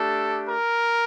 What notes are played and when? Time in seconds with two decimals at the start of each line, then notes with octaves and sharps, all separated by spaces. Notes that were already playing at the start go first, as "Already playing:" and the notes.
Already playing: A3 D4 G4 A4
0.49 A#4